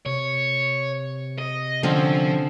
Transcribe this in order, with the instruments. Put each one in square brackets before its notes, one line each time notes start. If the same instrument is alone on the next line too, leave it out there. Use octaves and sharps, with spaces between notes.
[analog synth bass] C3 [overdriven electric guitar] C#5
[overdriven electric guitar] D#5
[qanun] D3 C4 C#4 [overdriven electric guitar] F3